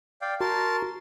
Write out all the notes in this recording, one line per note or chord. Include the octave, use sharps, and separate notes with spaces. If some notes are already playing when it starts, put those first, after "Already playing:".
D5 F5 G5
F#4 A#4 A5 C6